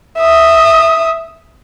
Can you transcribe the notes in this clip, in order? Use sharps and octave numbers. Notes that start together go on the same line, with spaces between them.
E5 D#6